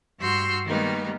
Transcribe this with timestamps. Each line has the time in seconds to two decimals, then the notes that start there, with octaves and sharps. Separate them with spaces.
0.19 G2 F#4 C6 E6 F6 G6
0.64 D#3 G3 G#3 A#3 B3 D#4